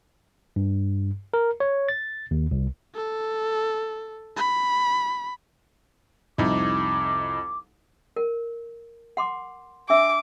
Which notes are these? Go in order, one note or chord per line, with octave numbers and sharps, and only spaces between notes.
G2
A#4
C#5
A6
D#2
C2
A4
B5
C2 F2 D#4 E4 D6
A#4
F#5 C6 D6
D4 E5 D6 E6